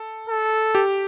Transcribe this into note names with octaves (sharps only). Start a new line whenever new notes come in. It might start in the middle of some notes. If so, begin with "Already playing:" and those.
Already playing: A4
A4
G4